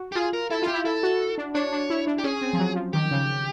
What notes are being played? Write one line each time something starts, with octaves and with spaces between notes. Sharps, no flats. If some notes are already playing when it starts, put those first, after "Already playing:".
Already playing: F#4
G4
F4 G#4
A#4
E4 A4
F4 G4
E4
E4 A4
F#4
D4
D4 C#5
D4
E4
D4
G4
C#4 G#4
C4
F3
F#3
F3
D#3 G4
C#3